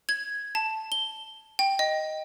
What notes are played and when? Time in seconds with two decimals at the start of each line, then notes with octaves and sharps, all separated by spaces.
0.09 G#6
0.55 A5
0.92 G7
1.59 G5
1.79 D#5